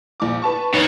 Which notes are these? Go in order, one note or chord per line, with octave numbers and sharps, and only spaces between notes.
A#1 D6
B4 A5 C#6
D#3 B4 C#5